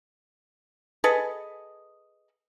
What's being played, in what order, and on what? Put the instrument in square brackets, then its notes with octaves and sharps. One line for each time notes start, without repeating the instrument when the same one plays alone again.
[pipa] G#4 A4 B4 D#5